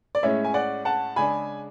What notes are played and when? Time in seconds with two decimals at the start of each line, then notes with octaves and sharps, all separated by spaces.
0.15 D5
0.23 A2 G#3 C#4 C#5 E5
0.45 G#5
0.54 D5 F#5
0.85 F#5 A5
1.16 C#3 G#3 D4 G#5 B5